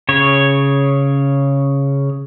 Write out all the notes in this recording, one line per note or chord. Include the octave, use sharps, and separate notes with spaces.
C#3 C#5